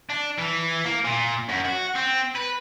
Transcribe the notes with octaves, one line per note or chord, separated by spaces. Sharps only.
D4
E3
A#3
A#2
F#2
F#4
C4
B4